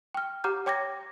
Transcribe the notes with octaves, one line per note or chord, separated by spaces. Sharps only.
G5 F6
G4 F#5 A#5 D6 F6 G6
C#5 G5 D6 G#6 A#6